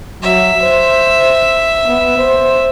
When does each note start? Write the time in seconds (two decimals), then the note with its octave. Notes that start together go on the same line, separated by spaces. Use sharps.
0.23 F#3 E5
0.62 C5
1.87 B3
2.18 C5